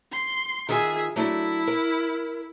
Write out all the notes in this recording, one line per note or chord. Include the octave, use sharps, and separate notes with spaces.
C6
D#3 F4 G#4 E5 G#5
F#3 A3 D4 E4
A#4